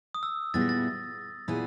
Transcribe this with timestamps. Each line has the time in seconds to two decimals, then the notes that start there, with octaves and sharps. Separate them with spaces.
0.15 D#6
0.23 E6
0.54 A#2 G3 B3 E4 G#4 A6
0.61 A#6
0.69 A6
1.48 A#2 G3 B3 E4 G#4